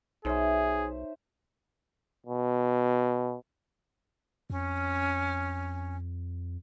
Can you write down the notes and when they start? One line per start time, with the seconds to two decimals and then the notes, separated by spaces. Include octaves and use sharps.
0.25 B1 D#4 G#4 C5 C#5 E5
2.27 B2
4.50 F2 C#4